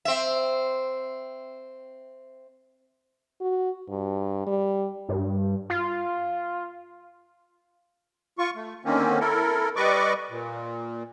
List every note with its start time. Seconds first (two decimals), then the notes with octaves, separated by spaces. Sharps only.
0.05 C4 E5
3.41 F#4
3.89 G2
4.47 G3
5.09 G2
5.70 F4
8.39 F4 C#6
8.56 A3
8.85 D3 D#3 A#3 C4 C#4
9.20 E4 A4 A#4
9.76 G3 B4 D5 D#5 C#6 D6
10.30 A#2